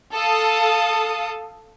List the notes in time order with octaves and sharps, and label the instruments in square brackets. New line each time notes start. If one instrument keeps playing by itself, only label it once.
[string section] A4 F5 D#6